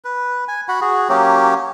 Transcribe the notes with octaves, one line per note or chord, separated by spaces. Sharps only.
B4
G#5
F#4 F#5 B5
F#4 G#4
F#3 A#3 C#4 G4